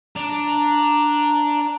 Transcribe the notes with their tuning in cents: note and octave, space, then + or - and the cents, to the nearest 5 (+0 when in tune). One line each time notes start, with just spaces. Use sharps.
D4 +0 A#5 +0